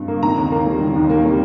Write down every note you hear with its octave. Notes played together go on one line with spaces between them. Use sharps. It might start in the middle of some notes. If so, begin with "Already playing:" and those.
Already playing: G2
A#3
D#3 A#5
D#2
A#3
G3
D#3
D#2
A#3
G3